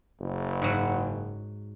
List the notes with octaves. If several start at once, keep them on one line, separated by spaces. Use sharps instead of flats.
F#1
G#2 F#3